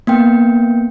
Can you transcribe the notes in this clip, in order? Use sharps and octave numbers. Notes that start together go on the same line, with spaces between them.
A#3 B3 G5